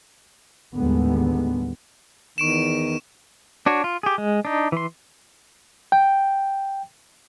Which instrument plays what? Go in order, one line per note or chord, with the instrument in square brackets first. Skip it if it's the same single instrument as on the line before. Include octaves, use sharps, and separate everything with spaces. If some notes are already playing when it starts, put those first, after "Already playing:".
[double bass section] D#2 A2 D3 G3 G#3 B3
[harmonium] E2 D#3 [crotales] C#6 D7 E7
[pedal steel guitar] D4 F#4 C#5
F4
G4 G#4
G#3
D4 D#4
E3 C6
[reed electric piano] G5